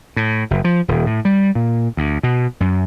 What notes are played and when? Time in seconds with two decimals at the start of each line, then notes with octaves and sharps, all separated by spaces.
0.16 A2
0.51 F#1
0.64 F3
0.88 D#1
1.06 A2
1.25 G3
1.55 A#2
1.97 D2
2.23 B2
2.60 F#2